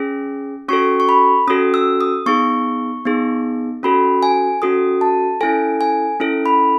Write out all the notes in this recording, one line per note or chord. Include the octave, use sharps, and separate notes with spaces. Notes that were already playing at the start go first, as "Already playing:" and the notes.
Already playing: C#4 G#4
C#4 F#4 A4 C#6
C#6
B5
C#4 F#4 A4 D#6
E6
D#6
B3 D#4 G#4 C#6
B3 D#4 G#4
C#4 F#4 A4 B5
G#5
C#4 F#4 A4 D#6
A5
C#4 E4 A4 G#5
G#5
C#4 E4 A4
B5